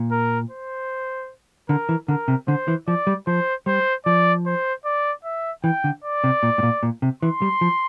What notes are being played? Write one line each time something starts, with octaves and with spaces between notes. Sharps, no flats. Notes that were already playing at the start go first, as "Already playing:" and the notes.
Already playing: A#2
A#4
C5
D3 A#4
E3
D3 A#4
C3
D3 C5
E3
F3 D5
G3
F3 C5
G3 C5
F3 D5
C5
D5
E5
E3 G5
D3
D5
C3
A#2
A2
A#2
A#2
C3
E3 C6
G3
F3